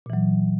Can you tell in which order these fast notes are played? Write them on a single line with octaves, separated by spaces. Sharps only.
A#2 E3 F#3